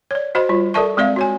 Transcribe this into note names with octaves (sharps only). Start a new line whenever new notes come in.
C#5 D5
F#4 C5 D#5 B5
G3 F4
A4 A#4 D5 E5 A5 C#6
G#3 C4 D5 E5 F5
F#4 C#5 G#5